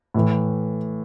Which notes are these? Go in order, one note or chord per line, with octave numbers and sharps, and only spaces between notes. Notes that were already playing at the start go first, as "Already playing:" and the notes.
A2 E3